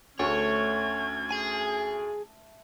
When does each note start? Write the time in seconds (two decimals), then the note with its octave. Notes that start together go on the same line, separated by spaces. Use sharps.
0.19 D2 A3 C#4 C#5 G#6
1.31 G#4 G#5